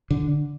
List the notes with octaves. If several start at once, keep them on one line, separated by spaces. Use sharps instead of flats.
D3